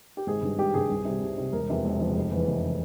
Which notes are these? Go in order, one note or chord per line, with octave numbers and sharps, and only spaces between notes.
G4
G#1 G#4
G2 G3
G#1 G4
G2 G3 G#4
C2
C3 G3
C2
C3 G3
E1 A#4
E2 C3 F3
E1
E2 C3 F3
F1
E2 E3
F1
E3